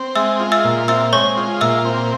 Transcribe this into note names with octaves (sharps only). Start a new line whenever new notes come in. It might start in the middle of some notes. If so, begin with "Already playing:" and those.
Already playing: C4
G#3 E5 E6
F4
E5 E6
A#2
C4 E5 E6
G#3 C#5 C#6
F4
A#2 E5 E6
C4